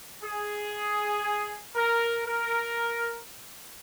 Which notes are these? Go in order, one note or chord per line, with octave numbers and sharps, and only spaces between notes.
G#4
A#4
A#4